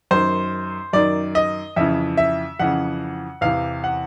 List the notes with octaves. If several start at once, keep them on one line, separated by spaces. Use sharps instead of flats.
F#2 D#3 C5
F#2 D#3 D5
D#5
F2 C#3 E3 E5
E5
F2 C#3 E3 F#5
E2 C3 E3 F5
F#5